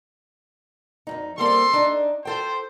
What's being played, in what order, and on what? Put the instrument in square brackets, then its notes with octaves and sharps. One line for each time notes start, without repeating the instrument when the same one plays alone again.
[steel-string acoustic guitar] F2 G#2 D#4
[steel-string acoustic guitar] G3 A#3 C4 [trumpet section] A4 C6
[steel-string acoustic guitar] D4 D#4
[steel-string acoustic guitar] F4 A4 G5 [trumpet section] C5